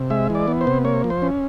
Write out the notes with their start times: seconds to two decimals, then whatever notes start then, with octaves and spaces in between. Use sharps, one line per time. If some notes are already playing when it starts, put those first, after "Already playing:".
Already playing: C3
0.10 G#3 E5
0.30 E3
0.35 D5
0.48 B3
0.61 C5
0.67 C3
0.85 A#3 C#5
1.04 F3
1.10 C5
1.22 C#4